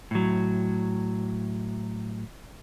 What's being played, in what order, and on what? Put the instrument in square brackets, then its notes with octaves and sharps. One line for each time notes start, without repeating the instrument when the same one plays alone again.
[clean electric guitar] A2 F#3